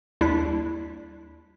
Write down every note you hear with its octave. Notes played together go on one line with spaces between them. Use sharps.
D#2 G3 D4 E4 B6